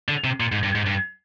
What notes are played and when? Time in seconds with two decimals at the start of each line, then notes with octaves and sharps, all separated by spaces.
0.09 D3
0.24 C3
0.40 A#2
0.52 G#2
0.63 G2
0.75 G#2
0.86 G2